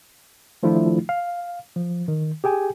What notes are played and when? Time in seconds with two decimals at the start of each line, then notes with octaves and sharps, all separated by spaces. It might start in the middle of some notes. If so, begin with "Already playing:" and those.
0.63 D#3 F3 A3 D4 E4 F4
1.09 F5
1.76 F3
2.08 D#3
2.44 G4 G#4 G5 G#5